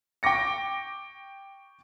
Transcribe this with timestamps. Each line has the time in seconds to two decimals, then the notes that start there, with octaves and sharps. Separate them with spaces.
0.23 G5 C#6 D6 A#6 C#7